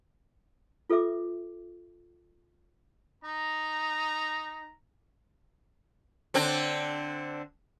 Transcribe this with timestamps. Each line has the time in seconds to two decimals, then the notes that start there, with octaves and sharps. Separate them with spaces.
0.90 F4 A4 B4 E5 D6
3.24 D#4 A#5
6.34 D3 C4 D4